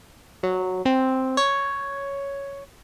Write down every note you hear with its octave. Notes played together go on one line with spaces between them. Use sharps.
F#3
C4
C#5